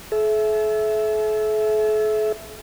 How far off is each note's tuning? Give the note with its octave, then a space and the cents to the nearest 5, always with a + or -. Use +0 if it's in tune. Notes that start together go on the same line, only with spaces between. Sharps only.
A4 -45 E5 +0